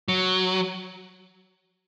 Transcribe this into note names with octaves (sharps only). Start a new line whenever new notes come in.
F#3